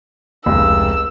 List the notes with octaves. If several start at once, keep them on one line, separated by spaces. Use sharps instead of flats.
F1 C#2 E6